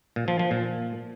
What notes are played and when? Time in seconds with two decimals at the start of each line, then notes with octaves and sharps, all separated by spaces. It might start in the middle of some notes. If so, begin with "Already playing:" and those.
0.16 A#2
0.28 F3
0.39 F3
0.51 A#2